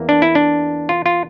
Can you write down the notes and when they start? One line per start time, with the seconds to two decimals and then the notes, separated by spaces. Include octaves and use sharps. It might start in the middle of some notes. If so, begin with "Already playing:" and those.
Already playing: E2 E3 A#3
0.09 D4
0.22 E4
0.35 D4
0.89 F4
1.06 F4